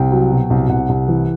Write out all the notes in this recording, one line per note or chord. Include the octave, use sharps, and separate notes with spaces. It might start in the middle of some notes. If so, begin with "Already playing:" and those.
Already playing: C2 G5
F#3
B2
C2
C2 F#5
C2
E3